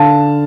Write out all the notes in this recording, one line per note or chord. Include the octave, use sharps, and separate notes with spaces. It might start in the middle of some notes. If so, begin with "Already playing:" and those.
Already playing: D3 F5 A5